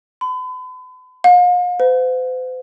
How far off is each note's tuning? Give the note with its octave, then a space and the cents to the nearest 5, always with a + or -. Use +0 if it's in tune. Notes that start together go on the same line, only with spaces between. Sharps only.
B5 +40
F5 +40
C5 -45